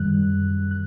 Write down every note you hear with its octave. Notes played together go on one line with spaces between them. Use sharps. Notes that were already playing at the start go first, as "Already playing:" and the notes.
Already playing: F#2 D#3 G3 F#6
F#6